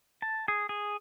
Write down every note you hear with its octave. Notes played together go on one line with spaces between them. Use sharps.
A5
G#4
G#4